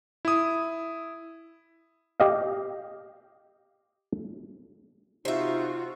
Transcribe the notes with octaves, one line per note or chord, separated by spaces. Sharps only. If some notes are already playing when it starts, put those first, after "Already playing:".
E4 D#6
G4 D#5 F5
C3 D#4 F4 F#4 C5 E5